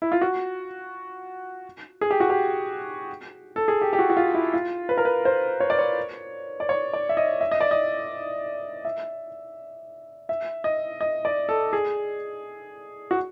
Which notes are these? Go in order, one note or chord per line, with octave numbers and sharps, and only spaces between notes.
E4
F4
F#4
G#4
G4
F#4
G4
A4
G#4
G4
G4
F#4
F#4
F4
E4
F4
B4
A#4
B4
C5
C#5
D5
C#5
D5
C#5
D5
E5
D#5
E5
D#5
D5
D#5
E5
E5
D#5
D#5
D5
A4
G#4
F#4